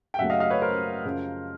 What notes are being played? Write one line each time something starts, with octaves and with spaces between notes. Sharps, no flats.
G5
F#2 C#3 F#3 A3 E5 F#5
D#5 F5
D#5 F5
B4 C#5
A#4 C5
F#2 C#3 F3